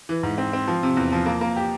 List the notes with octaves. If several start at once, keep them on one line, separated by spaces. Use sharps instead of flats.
E3
G#2
C4
C4
F3
C3
E2
F3
A#3
A#3
G4